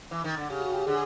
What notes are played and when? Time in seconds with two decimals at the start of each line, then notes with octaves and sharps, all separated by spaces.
0.11 E3
0.24 D#3
0.37 D3
0.50 C#3 G4
0.61 F#4
0.73 G4
0.86 D3 G#4